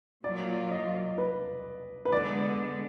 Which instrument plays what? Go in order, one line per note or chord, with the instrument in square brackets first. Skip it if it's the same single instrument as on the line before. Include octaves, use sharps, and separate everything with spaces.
[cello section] A#2 F#3 A#3 F4 [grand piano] D5
[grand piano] D#5
B4
B4
[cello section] D3 G#3 B3 [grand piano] D5